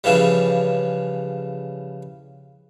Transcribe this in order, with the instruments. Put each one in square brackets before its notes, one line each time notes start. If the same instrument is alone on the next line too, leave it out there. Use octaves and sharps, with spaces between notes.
[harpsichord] C#3 E3 F3 G3